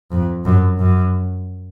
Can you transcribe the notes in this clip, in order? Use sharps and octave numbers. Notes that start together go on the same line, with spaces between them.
F2
F#2
F#2